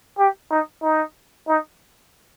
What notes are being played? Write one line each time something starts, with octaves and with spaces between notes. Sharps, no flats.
G4
D#4
D#4
D#4